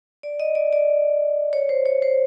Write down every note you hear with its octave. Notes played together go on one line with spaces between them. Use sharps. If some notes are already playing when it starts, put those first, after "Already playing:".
D5
D#5
D5
D5
C#5
C5
C#5
C5